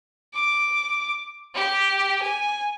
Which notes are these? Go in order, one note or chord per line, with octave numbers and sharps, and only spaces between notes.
D6
G4
G#5